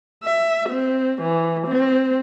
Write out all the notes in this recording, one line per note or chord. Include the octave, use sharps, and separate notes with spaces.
E5
C4
E3
C4